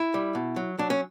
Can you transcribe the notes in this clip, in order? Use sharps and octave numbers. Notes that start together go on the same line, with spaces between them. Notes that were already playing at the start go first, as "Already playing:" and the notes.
Already playing: E4
G3
B2
F#3
F#3 D4
C#4